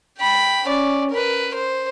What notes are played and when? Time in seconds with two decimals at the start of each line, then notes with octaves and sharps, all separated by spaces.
0.19 G5 B5
0.66 C#4 D5
1.11 A#4 B4
1.54 C5